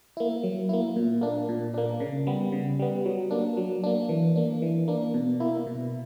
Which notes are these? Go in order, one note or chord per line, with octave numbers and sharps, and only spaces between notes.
A#3 E4
F#3
A#3 E4
A#2
A#3 D4
A#2
A#3 D4
C#3
G3 B3
C#3
G3 B3
F#3
A#3 D4
F#3
A#3 D4
E3
A#3 D4
E3
A#3 D4
B2
A#3 E4
B2